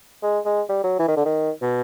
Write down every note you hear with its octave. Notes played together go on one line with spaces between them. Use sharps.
G#3
G#3
G3
F#3
E3
D#3
D3
D#3
B2